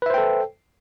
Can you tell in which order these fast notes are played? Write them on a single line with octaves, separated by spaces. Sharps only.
B4 E5 C5 G5 A4